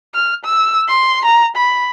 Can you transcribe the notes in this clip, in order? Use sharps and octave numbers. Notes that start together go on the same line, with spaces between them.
F6
E6
C6
A#5
B5